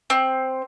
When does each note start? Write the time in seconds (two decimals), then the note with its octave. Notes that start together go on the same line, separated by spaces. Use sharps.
0.10 C4